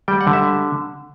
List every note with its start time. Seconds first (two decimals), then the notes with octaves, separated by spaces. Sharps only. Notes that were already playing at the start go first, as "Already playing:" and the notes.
0.08 G3 G5
0.21 F#5
0.27 D3
0.33 E5